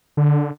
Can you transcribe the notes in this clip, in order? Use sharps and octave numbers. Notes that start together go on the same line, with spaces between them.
D3